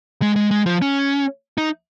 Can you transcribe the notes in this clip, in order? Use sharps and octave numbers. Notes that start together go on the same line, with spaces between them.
G#3
G#3
G#3
F3
C#4
D#4